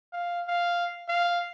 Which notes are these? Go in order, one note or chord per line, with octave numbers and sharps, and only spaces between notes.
F5
F5
F5